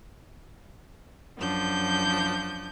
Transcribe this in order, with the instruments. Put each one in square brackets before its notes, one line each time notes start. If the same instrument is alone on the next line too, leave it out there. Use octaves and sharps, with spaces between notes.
[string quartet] F#2 F3 D4 G6